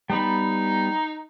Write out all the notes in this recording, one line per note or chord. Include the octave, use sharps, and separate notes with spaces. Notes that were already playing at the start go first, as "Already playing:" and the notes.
G3 B3 D#4 B5